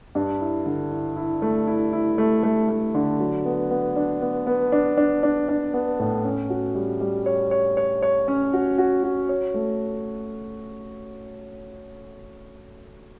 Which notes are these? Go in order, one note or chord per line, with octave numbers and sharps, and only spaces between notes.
G2
E4
D3
E4
E4
A3
E4
E4
A3
A3
A3
D3
F#3
B3
B3
D4
B3
B3
D4
D4
D4
D4
B3
A2
C#4
F#4
G3
G3
C#5
C#5
C#5
C#5
C#4
F#4
F#4
F#4
C#5
A3